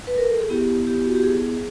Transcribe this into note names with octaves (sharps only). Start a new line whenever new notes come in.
B4
A#4
A4
G#4
B3 E4 G4
G4
F#4
G4
G#4